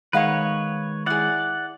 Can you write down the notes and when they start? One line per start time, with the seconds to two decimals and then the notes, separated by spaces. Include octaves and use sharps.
0.13 D#3 G#3 D#4 B4 C#5 F5 F#5
1.06 E4 G#4 D5 F#5